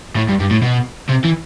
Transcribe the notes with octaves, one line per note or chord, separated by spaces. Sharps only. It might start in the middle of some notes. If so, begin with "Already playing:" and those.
A2
G2
G2
A2
B2
C3
E3